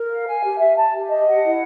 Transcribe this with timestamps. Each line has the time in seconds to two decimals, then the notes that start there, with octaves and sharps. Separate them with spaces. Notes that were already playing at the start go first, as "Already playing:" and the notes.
Already playing: A#4
0.10 F5
0.27 G#5
0.43 G4
0.60 E5
0.76 A5
0.93 G4
1.10 D#5
1.26 F#5
1.43 E4